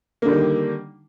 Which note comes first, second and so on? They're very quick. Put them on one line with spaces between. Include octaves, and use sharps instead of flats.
A#3 D3 G3 D#3